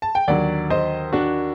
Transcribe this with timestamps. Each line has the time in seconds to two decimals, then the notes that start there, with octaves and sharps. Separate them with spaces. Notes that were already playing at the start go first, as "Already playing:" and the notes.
0.02 A5
0.15 G5
0.28 D#2 D3 F#3 D5 F#5
0.70 C5 D#5
1.13 D4 F#4